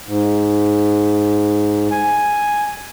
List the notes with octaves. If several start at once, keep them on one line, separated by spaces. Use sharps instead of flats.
G#2
G#5